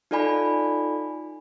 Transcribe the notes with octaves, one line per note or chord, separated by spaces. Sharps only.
D#4 F4 A4 D5 G#5 B5